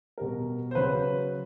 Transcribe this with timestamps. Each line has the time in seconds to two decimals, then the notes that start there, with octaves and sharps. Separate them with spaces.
0.18 B2 G3 A#4
0.71 C5
0.75 C#3 F#3 B4